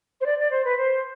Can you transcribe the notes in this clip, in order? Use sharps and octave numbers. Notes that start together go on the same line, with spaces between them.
C5
D5
D5
C5
B4
C5